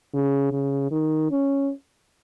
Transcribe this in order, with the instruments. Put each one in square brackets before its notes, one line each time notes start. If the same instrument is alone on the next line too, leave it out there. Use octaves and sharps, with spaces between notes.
[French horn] C#3
C#3
D#3
C#4